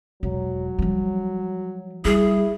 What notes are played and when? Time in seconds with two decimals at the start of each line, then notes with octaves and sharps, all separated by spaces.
0.23 E1 F#3
0.79 F3 G3
2.05 G3 E4 G#4